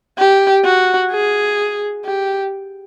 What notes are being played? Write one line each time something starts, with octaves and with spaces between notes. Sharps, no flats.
G4
F#4
G#4
G4